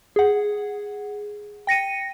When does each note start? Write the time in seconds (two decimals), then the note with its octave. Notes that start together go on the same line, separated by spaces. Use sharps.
0.16 G#4 F#5
1.67 G5 A#6 C#7 D#7